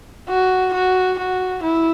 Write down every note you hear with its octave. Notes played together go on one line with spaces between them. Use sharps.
F#4
F#4
F#4
E4